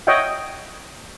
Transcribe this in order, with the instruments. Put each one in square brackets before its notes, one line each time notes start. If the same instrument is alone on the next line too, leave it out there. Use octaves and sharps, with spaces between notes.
[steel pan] C#5 D#5 E5 F#5 G5